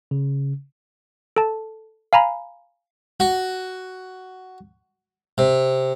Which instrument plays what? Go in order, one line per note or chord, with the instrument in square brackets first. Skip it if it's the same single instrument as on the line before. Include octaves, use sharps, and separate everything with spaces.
[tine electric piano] C#3
[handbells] A4 A5
F5 G#5 A#5 B5
[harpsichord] F#4
C3